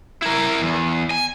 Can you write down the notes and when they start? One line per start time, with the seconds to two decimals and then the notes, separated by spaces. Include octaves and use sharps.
0.22 E4 A#4
0.62 E2
1.11 G#5